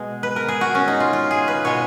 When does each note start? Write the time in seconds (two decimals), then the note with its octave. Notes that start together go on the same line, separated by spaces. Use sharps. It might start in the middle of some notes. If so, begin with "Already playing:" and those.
Already playing: B2 G#3 G#4
0.23 B4
0.36 A#4
0.48 G#4
0.61 F#4
0.75 C#4
0.88 D#4
1.00 F4
1.13 F4
1.31 G#4
1.48 B4
1.65 B2 G#3 C#5